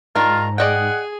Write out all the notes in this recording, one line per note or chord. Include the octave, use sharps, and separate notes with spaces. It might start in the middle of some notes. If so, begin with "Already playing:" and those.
G#2 D#3 D4 F4 A#4 A#5
G#4 D5 D#5 F#5 G5